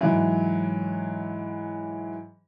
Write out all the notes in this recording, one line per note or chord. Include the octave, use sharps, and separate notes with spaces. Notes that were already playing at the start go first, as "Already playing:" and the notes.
G#2 E3 F#3